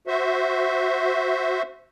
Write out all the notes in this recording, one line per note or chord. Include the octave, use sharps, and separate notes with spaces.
F#4 C5 E5